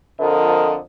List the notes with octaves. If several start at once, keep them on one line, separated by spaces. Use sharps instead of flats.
F2 D3 F3 A#4 D#5